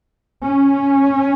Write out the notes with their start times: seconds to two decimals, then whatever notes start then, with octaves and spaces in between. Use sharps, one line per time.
0.43 C#4